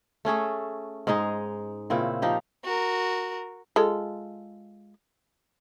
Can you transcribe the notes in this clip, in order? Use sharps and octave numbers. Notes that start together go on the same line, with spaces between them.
A3 C#4 G#4 A4
G#2 G#3 D#4 G#4
A#2 C#3 C4 E4
F3 D#4 G4
F#4 A#4
G#3 F4 A4